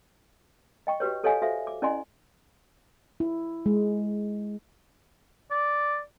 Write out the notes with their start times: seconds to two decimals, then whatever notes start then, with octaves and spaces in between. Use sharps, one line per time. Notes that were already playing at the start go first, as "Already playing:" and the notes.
0.87 D#5 G5 C#6
1.00 F#4 G4 B4 C#5
1.23 G4 A4 C#5 D#5 F5 G#5
1.42 F#4 A4 C5 E5 F5
1.67 D6
1.82 C#4 E4 D5 D#5 G#5 C6
3.20 E4
3.66 G#3
5.51 D5